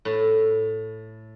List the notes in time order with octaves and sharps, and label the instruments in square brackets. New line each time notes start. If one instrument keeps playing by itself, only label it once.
[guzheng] A2